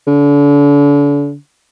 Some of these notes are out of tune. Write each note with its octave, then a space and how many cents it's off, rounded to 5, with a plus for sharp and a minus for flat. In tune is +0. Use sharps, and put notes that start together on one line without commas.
D3 -35